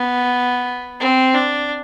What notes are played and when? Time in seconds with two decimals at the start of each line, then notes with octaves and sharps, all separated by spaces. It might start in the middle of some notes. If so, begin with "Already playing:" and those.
Already playing: B3
1.00 C4
1.34 D4